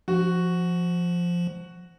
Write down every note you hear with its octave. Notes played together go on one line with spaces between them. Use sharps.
F3 F#4